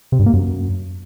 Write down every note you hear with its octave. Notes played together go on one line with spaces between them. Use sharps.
C3
G2
A#3
F#2